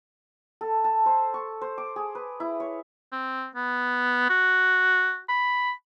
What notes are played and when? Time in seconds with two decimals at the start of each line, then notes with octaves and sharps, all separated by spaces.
0.61 A4
0.84 A5
1.06 C5
1.34 C#6
1.62 C5
1.78 D6
1.96 G#4
2.15 B4
2.40 E4
2.60 C#5
3.12 C4
3.55 B3
4.29 F#4
5.29 B5